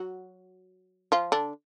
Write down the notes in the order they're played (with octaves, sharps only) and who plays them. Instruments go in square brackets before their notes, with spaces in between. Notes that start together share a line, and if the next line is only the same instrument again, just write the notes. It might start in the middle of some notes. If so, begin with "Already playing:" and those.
Already playing: [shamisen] F#3 F#4
F3 F4
D3 D4